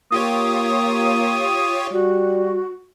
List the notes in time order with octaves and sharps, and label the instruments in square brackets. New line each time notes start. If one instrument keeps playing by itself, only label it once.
[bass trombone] A#3 [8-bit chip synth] F4 G4 C#5 [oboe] D#6
[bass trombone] G3 [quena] F#4